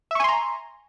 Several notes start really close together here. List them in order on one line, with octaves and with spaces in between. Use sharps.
E5 C#6 G#5 C6 A#5